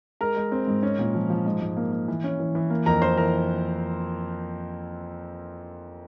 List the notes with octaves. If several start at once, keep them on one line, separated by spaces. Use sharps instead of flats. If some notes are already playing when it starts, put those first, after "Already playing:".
G#3 A#4 A#5
G#3
C4
G#2
C#4
A#2
F3
F3
G#2
G#2
A#3
A#3
E3
C#4
E3
E3
A#3
F2 A#4 A#5
A#3 C5 C6
E3 A#4 A#5